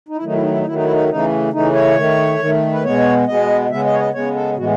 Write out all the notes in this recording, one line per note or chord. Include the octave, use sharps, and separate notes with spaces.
D#4
E4
D#3 F#3 A3 D#4
E4
D#4
E4
D#4
D#3 F#3 A3 E4
D#4
E4
D#4
C#3 E3 A3 D#4
C#3 E3 A3 D#4
C#5
D#3 A3
D#3
A3
B4
B2 G#3 B3 C#5
B2 G#3 B3 D#5
C#3 G#3 B3 E5
D#5
C#5
D#5
C#3 G#3 B3 C#5
A4
A2 E3 G#3 B3 F#4